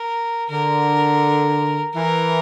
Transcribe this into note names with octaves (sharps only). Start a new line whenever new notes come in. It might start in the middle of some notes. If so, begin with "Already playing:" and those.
Already playing: A#4
D3 A#4
E3 A#4